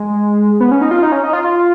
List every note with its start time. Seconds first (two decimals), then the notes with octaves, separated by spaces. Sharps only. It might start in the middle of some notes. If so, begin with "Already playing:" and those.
Already playing: G#3
0.60 B3
0.71 C#4
0.82 D#4
0.91 F4
1.03 D#4
1.12 C#4
1.24 D#4
1.33 F4
1.44 F4